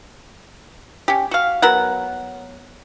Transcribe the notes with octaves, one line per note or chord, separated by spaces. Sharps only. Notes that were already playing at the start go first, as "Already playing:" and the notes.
C#4 G4
F#4 F5
F#3 B3 A#4 F#5